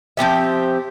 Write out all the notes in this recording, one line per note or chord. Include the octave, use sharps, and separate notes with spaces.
F3 C4 G4 E5